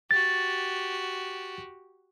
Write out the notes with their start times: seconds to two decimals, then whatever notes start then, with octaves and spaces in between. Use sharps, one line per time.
0.11 F#4 G4 A6